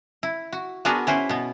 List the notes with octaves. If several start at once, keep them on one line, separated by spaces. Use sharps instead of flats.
E4
F#4
B3 D4 F#4 G#4 A#4 B4
C#4 E4 B4 C5
B2 B3